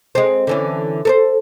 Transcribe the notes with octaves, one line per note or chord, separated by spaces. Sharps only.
G#3 C4
D3 E3 C#4
A4 A#4 C5